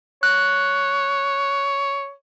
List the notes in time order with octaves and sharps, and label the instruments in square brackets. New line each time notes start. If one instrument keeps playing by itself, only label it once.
[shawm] C#5 [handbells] F#6